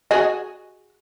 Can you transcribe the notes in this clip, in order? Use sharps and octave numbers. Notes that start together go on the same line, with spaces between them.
F#4 G#4 D#5